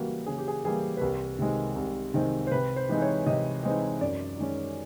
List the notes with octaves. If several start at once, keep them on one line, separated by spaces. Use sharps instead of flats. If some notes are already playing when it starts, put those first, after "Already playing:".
Already playing: C#3 E3 G3 A#3 F#4
C#3 G#4
G4
G#4
E3 G3 A#3 G#4
B4
C2 A#4
C3 D#3 G#3 C4
C2
C3 D#3 G#3 C4
C5
C3 B4
C5
E3 G#3 C4 D#4
C#5
C3 D#5
E3 G#3 C4 D#4 D#5
F#2 D5
D#3 G#3 C#4